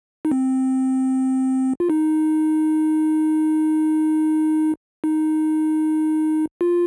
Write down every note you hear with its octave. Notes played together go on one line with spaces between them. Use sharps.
D#4
C4
F4
D#4
D#4
F4